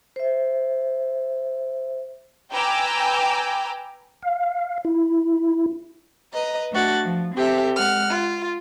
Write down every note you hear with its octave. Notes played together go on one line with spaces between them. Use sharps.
C5 E5
B4 G5 G#5 A#5 D6 E6
F5
E4
B4 D#5 A#5
A3 D4 F#4 A6
F3
C4 G4 A4 E5
G#3 F#5 F6
F4